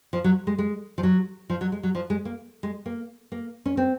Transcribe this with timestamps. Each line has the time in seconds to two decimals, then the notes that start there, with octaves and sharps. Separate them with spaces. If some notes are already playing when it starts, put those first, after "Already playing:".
0.13 F3
0.24 F#3
0.47 G#3
0.58 G#3
0.98 F3
1.03 F#3
1.50 F3
1.61 F#3
1.72 G#3
1.83 F#3
1.95 F3
2.10 G#3
2.25 A#3
2.63 G#3
2.86 A#3
3.32 A#3
3.66 C#4
3.77 C4